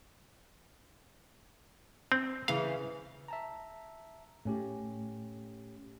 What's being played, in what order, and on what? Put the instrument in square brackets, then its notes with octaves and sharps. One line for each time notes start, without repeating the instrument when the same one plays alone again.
[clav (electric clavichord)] C4
[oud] C#3 E3 [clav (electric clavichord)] F5
[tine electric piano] E5 A5 A#5
[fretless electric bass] A2 [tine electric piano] A3 C#4 G4